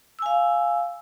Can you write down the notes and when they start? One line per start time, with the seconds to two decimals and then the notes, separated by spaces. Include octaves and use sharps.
0.19 E6
0.22 G#5
0.26 F5